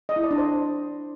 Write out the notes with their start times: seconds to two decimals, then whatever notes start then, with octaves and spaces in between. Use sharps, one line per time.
0.09 D#5
0.16 E4
0.23 D5
0.31 D4
0.38 C5